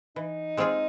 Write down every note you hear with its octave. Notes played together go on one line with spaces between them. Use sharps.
E3 D#4
G#3 C4 F4 G#4